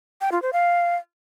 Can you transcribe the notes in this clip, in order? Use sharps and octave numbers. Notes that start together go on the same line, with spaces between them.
G5
F4
C5
F5